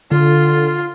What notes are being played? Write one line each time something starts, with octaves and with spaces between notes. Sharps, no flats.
D3 F4